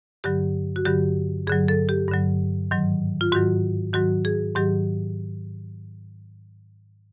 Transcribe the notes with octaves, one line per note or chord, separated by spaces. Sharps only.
G2 D3 F#3 G4
F#4
G2 D3 F#3 G4
G2 D3 F#3 G#4
A4
G4
G2 D3 F#3
G#2 D#3 F#3
F4
G#2 D#3 F#3 F#4
G#2 D#3 F#3 F#4
G#4
G#2 D#3 F#3 G4